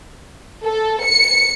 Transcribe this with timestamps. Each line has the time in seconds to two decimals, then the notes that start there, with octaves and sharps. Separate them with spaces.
0.64 A4
1.05 C#7